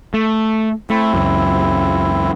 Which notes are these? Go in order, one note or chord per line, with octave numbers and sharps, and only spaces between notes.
A3
A3 C4 E4
C#2 F#2